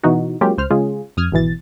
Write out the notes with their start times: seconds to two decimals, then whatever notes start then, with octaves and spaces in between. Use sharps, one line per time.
0.03 B2 E3 D#4 F#4
0.41 F#3 G#3 A#3 C#4 F4 G4
0.58 C#2 C5 F6
0.71 C#3 G#3 C#4 F4 G#4
1.17 F2 D#6 F6 G#6
1.32 G#1 B2 E3 A6